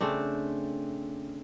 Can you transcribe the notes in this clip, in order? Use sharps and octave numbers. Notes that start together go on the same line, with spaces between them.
C#3 A3 C4 D4